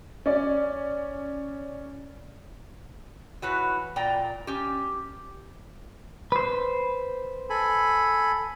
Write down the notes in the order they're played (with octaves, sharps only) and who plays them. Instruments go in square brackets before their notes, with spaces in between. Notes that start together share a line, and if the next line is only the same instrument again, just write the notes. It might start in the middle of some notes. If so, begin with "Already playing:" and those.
[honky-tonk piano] C#4 D5
[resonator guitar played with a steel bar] E3 F#4 B4 C#5
A#2 D5 G5 A#5
C#4 G4
[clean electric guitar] B4 C5
[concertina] A4 G#5 B5